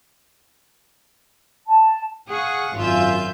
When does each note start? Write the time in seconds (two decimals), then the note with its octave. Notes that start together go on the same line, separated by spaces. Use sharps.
1.66 A5
2.28 G#4 F5 F#5 C#6
2.76 G#1 F#2 F4 E5 G#5 G6